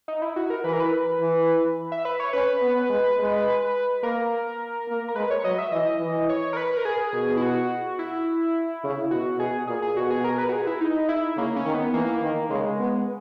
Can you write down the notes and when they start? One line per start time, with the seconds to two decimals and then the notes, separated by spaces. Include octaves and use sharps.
0.08 D#4
0.22 E4
0.36 F#4
0.50 A#4
0.64 E3 B4
0.73 A#4
0.80 B4
1.21 E3
1.92 E5
2.05 B4
2.20 C#5
2.33 C#4 B4
2.62 B3
2.90 G#3
3.19 G#3
4.03 A#3 A#4
4.88 A#3
5.08 A#4
5.15 G#3 B4
5.31 C#5
5.45 F#3 D#5
5.58 E5
5.72 E3 D#5
6.00 E3
6.29 C#5
6.53 A#4
6.57 B4
6.77 A#4
6.85 G#4
7.14 B2
7.37 E4
7.42 F#4
7.99 E4
8.84 C#3
9.11 B2 F#4
9.39 B2 G#4
9.67 A#2 G#4
9.82 G#4
9.96 B2 F#4
10.10 G#4
10.24 A#4
10.38 B4
10.49 F#4
10.52 G#4
10.67 E4
10.81 D#4
11.09 E4
11.37 C#3 A#3
11.56 C#4
11.65 D#3
11.74 B3
11.93 E3 A#3
12.22 D#3
12.50 C#3 G#3
12.79 B3